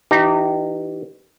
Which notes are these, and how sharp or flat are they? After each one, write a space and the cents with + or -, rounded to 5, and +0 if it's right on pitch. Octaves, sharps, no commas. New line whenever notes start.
E3 +0 D#4 -25 G4 -20